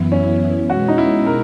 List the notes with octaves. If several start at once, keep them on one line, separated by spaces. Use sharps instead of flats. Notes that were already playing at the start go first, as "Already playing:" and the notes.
Already playing: F#2 E3 B3 E4
C#4
B2 G#3 C#4 F#4
D#4
E4
A#4